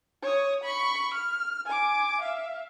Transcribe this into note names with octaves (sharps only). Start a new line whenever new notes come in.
C#5 D#6
B5 C#6
F6
G#5 D6
E5 F5